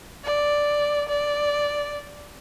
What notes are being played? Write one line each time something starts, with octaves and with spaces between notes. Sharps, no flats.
D5
D5